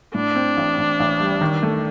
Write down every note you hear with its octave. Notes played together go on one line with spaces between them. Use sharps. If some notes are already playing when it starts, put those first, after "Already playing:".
A2 D4
C4
A1
A1
A1
G3
D#3
A3